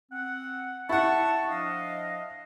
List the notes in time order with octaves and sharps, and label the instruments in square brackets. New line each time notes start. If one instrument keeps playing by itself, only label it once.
[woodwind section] C4 F#5
[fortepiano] E4 F#5 [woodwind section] A5 [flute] C#6
[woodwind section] F3 D4 D#5 [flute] F5